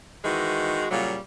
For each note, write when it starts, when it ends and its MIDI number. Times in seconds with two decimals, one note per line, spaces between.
0.23 0.85 51
0.23 0.85 52
0.23 0.85 56
0.23 0.85 66
0.91 1.16 46
0.91 1.16 49
0.91 1.16 54
0.91 1.16 55